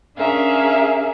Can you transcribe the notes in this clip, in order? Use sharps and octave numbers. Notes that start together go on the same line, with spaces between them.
C#4 D4 G#4 A#4 E5 F5